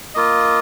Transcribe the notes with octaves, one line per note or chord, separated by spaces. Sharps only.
A#3 F4 D#5